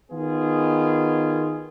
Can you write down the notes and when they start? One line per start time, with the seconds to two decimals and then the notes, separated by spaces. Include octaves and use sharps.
0.10 D#3 B3 F4 G#4